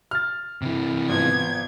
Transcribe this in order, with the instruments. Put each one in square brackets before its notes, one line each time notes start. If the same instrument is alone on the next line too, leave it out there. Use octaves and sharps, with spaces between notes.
[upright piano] F6 A6
[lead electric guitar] C3 E3
[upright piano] G#1 F3 B3 [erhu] G#6